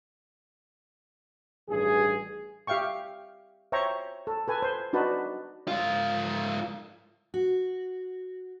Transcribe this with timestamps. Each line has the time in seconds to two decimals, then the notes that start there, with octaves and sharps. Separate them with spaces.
1.69 A1 G2 D#3 G#4
2.67 G4 E5 F5 G5 C#6
3.72 C5 C#5 E5 G5 A#5 C#6
4.27 A4
4.48 A4 B4 G#5
4.62 C5
4.93 D4 D#4 F#4 B4 A5
5.68 G#2 F4
7.34 F#4